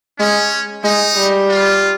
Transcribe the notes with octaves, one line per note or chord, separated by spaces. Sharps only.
G#3 C#4
G#3 D#4
G3
F4